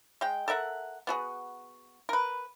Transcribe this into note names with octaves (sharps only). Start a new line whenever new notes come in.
G#3 G5
A4 A#4 E5 F#5
B3 F#4 G#4
A#4 B4